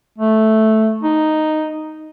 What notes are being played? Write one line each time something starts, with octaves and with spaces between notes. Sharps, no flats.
A3
D#4